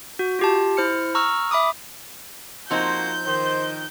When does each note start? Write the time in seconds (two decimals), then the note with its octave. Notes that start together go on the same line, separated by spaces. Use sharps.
0.19 F#4
0.39 F4 G4 A5
0.77 E4 C5 F6 C#7
1.15 A#5 C#6 E6 F6
1.51 E5 B5 D6 D#6
2.71 F3 A#3 C4 D#4 F#4 C5 G6
3.27 D#3 C5